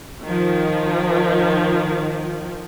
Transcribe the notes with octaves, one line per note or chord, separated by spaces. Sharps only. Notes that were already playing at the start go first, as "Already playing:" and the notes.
D#3 F3